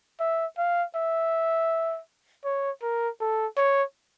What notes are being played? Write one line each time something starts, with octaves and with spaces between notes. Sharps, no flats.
E5
F5
E5
C#5
A#4
A4
C#5